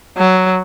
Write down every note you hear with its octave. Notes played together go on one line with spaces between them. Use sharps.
F#3